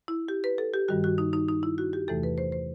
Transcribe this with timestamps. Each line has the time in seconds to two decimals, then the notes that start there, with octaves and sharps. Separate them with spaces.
0.08 E4
0.28 G4
0.44 B4
0.58 A4
0.74 G4
0.88 G2 D#3 G3 F#4
1.04 F#4
1.18 D#4
1.33 D#4
1.48 D#4
1.63 E4
1.78 F#4
1.93 G4
2.08 E2 C3 E3 A3 A4
2.23 B4
2.38 C5
2.52 C5